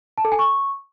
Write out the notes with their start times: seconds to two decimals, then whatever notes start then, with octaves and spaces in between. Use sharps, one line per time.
0.18 A5
0.25 A4
0.32 G#5
0.39 C#6